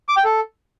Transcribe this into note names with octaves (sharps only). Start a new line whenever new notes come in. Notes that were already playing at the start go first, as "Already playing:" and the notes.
D6
G5
A4